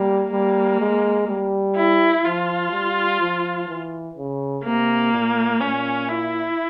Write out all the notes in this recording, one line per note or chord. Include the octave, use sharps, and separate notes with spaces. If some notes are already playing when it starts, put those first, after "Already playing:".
Already playing: G3 A#3
G3 A#3
G#3
G3
E4
F3 F4
G3
F3
E3
C#3
C3 A#3
A#2
A#2 C#4
E4